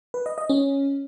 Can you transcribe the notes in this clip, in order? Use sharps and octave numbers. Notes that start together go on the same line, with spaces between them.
B4
D#5
D#5
C#4